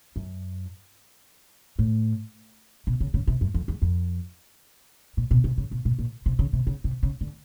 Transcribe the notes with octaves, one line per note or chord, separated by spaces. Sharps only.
F#2
A2
B2
C#3
C#3
C3
F#2
F2
E2
F2
A#2
B2
C3
C#3
B2
B2
A#2
C3
C#3
C3
C#3
C3
C#3
D3